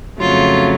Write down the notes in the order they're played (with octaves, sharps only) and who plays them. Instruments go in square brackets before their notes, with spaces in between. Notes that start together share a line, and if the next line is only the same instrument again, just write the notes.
[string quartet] F2 C#3 F#3 A3 F4